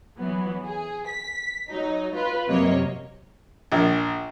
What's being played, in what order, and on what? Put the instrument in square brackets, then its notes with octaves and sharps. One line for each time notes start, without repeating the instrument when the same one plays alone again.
[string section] E3 F#3 B3
G#4
B6
F#3 D#4
F4 B4
F#2 C3 F#3 A#3 C#5 D#5
[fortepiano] A#1